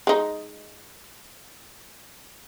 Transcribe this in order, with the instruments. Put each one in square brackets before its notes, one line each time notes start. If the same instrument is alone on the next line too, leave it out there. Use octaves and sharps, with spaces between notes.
[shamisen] G#3 D#4